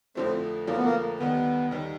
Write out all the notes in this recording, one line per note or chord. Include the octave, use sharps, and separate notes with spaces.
F2 D3 F3 A3 C4
F2 D3 F3 A3 A#3
B3
A#3
D#2 D#3 G3 B3
D#2 D#3 G3